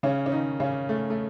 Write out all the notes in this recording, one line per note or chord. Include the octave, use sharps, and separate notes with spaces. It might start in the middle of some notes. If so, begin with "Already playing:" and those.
C#3 C#4
C#4
D#3 D#4
C#3 C#4
A3
A3